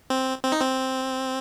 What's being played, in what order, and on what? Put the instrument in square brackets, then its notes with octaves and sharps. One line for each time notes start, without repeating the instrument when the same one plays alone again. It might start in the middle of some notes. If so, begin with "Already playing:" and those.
[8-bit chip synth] C4
C4
D#4
C4